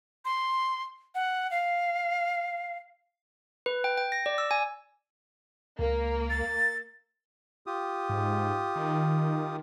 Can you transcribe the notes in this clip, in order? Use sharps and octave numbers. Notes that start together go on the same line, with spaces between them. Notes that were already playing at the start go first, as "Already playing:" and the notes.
C6
F#5
F5
B4
G5
G5
A#6
D5
E6
G#5
C#2 A#3
A6
F4 G4 D#6
G#2
D#3